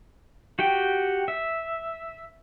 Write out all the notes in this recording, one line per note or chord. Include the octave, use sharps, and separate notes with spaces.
F#4 G4 G5
E5